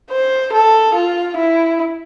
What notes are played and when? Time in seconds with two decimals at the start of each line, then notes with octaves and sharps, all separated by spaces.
0.10 C5
0.53 A4
0.94 F4
1.36 E4